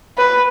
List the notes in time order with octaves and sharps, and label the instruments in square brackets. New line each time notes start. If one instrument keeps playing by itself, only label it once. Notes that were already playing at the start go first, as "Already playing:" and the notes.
[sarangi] B4